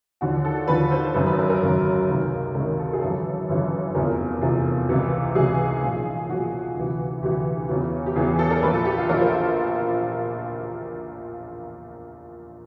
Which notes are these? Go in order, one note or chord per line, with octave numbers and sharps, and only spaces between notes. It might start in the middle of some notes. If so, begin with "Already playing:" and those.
D#2 D3 F3 F#4
A4
D#2 D3 F3 B4
C5
G#1 F#2 C#3 B4
B4
A#4
A#4
G#1 F#2 C#3
C#2 C3 D#3
C#2 C3 D#3 A#4
A4
G#4
G1 F#2 C#3 E3 A4
G1 F#2 C#3 E3
F1 E2 C3 F3 A#4
F1 E2 C3 F3
C#2 C3 E3
C#2 C3 E3 G#4
B1 A#2 F3
B1 A#2 F3 F#4
D2 C3 E3
D2 C3 E3 G4
E2 C#3 E3
G4
E2 C#3 E3 G#4
G4
A4
A#4
A#1 A#2 F3 B4
A4
G4
F4
A#1 A#2 F3 A#4
C5